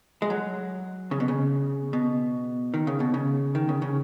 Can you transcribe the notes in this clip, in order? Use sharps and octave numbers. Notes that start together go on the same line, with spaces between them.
G#3
F#3
C#3
B2
C#3
B2
D#3
C#3
B2
C#3
D#3
C#3
C#3